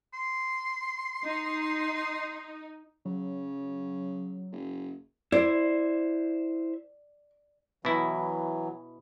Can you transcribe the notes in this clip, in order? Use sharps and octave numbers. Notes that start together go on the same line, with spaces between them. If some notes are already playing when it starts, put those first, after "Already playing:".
C6
D#4
C#3 F#3
F#1
E4 C5 D5
B2 E3 F#3 E4